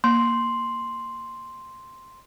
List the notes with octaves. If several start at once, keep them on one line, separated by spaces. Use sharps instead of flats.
A#3 C6